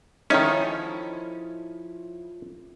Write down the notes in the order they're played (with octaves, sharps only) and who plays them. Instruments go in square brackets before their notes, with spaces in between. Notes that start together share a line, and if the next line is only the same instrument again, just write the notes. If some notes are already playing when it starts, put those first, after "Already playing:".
[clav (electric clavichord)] D#3 C#4 [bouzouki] F3 E4 C#5 [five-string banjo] D#4 G#4 A4